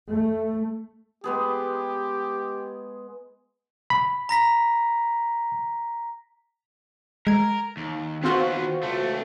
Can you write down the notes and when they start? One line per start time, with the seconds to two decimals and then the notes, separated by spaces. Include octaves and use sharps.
0.11 A3
1.24 G#3 B3 G4 G#4
3.90 B5
4.29 A#5 A#6 B6
7.27 G#3 A#4 G#6
7.77 D#2
8.24 D#2 B3 C4 F4 F#4
8.83 C#2 A3